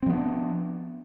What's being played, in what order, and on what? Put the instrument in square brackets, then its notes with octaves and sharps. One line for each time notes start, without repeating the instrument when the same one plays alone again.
[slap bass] C4
F3
B3
D4